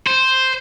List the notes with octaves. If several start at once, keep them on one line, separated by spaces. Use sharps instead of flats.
C5